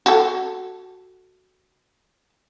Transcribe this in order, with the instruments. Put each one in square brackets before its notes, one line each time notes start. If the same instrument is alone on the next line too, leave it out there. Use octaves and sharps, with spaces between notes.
[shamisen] F#4 A4